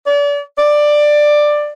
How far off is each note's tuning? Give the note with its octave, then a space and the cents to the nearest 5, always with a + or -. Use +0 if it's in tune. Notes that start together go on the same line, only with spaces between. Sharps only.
D5 -35
D5 +10